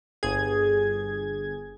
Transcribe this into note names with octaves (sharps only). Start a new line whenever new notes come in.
G1 G#4 G#6